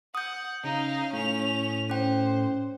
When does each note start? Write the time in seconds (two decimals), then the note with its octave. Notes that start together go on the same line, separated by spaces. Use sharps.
0.15 F#5 D#6 G6
0.64 C#3 D#4 F5
1.13 A2 C#4 F7
1.90 C#4 C5 G5